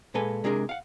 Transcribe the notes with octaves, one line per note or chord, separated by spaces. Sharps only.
A#2 G#3 A4 B4 G#5
C3 G#3 D4 G#4 A#4
F5 F#5